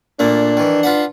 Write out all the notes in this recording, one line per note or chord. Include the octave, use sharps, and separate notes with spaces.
A#2 A3 A#3 D4
D#3 E3
F4 B4 F#5